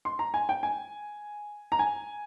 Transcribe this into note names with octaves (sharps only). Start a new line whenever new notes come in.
C6
A#5
G#5
G5
G#5
A#5
G#5